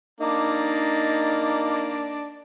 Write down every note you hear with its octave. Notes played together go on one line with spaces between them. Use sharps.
A#3 D4 D#4